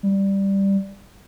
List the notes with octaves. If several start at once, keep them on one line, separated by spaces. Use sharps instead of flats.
G3